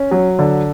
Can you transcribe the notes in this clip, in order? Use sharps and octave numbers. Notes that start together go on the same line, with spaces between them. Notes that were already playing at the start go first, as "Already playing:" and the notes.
Already playing: C#4
F#3
D3